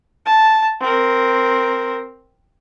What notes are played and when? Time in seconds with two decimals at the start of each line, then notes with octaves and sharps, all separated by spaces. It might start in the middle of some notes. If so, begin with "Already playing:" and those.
0.26 A5
0.81 C4 A#4